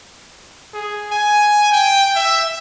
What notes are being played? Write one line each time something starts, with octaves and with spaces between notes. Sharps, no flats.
G#4
G#5
G5
E5